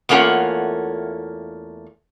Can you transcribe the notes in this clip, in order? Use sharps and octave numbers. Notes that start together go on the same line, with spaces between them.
E2 A3 A#3 C#4 F4 F#5